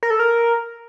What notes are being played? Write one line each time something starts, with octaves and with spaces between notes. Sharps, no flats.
A#4
A4
A#4